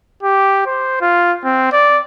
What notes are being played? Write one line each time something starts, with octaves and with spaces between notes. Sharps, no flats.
G4
C5
F4
C4
D5